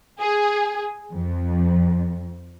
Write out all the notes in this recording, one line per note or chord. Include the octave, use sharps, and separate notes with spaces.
G#4
F2